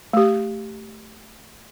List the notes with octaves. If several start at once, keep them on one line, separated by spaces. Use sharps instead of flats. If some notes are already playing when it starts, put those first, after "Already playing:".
A3 G4